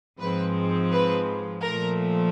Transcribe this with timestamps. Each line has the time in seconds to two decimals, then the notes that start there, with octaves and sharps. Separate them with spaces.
0.19 G#2 F3 G#3 C4 B4
0.91 B4
1.63 A#2 F3 A3 A#4